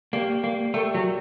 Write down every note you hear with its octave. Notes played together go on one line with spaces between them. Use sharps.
A#3 G4 D5 G5
A#3
A3 G4 A#4 D5 G5
F#3